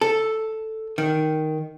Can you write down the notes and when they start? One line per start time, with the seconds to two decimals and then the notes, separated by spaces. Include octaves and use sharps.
0.01 A4
0.98 D#3